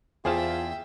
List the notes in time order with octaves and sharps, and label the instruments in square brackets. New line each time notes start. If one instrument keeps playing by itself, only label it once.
[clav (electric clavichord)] E2 A5 [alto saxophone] F4 [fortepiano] G#4 C5 F6 [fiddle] E5 G5